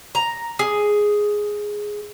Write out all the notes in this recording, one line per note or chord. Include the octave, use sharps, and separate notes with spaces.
A#5
G#4